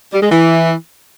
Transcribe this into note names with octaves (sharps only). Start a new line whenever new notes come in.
G3
G#3
E3